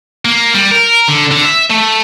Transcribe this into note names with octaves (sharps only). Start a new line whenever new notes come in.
A#3
G3
A#4
D3
D3
E5
A3